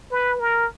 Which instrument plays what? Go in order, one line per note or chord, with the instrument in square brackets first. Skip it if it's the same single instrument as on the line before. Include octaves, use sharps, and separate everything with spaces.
[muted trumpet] B4
A#4